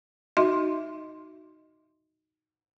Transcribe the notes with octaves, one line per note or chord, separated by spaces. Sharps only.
D#4 F#4 D#5 E5 C6